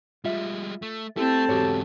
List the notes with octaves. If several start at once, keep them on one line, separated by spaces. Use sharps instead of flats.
G3 G#3 F4 E5
A3
A3 C4 E4 G4 A4 A5
E2 G#2 F#4 G4 C#5